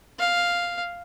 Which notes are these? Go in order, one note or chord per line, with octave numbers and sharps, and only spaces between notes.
F5